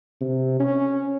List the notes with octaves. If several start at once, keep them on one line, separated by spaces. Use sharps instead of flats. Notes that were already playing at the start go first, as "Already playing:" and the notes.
C3
C#4